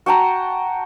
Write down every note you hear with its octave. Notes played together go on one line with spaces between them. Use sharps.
F#4 G5 A5 A#5